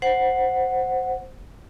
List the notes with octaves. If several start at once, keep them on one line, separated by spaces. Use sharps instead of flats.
C5 F#5